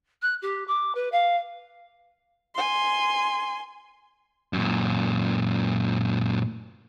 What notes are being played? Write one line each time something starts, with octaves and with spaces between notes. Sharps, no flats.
F#6
G4
D6
B4
F5
G#5 C6
F#2 A#2